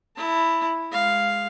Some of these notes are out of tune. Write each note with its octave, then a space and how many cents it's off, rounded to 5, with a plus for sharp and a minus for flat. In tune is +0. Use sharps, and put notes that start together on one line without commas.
E4 +0 A5 +30
G#3 +0 F5 +0